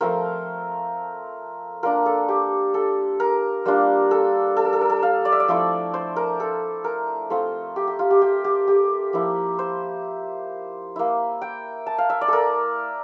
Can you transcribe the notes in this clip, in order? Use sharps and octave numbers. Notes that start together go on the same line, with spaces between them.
F3 A3 C4 F4 A#4
A#3 D4 F4 A#4
A4
G4
A4
A#4
G3 A#3 D4 F4
A4
A4
A#4
A4
A#4
A4
F5
D5
E5
D5
F3 A3 C4 E4
C5
A#4
A4
A#4
A3 C4 F4
G4
G4
F4
G4
G4
G4
G4
F3 A#3 E4
C5
A#3 E4
G5
A5
F5
E5
D5
A4 A#4